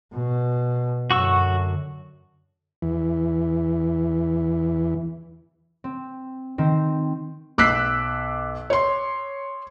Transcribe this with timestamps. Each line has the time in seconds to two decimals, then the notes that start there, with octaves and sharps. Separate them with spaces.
0.12 B2
1.11 F#2 D3 F#4 C#6 E6
2.82 E2 E3
5.84 C4
6.58 D#3 C4 C5
7.58 B1 D6 E6 F#6 B6 C7
8.70 C#5 C6